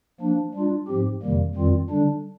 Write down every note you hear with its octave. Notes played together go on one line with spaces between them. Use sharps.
F3 A#3 D4
G3 D4 F4
G#2 F3 C4 G4
F2 C3 D#3 G3 A#3
F2 D#3 G3 C4 F4
D3 G3 D4